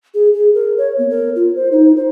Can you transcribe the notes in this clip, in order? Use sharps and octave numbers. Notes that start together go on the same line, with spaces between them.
G#4
G#4
A#4
C#5
B3
A#4
F4
C5
D#4
C5